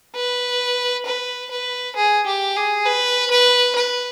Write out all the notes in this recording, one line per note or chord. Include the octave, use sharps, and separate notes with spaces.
B4
B4
B4
G#4
G4
G#4
B4
B4
B4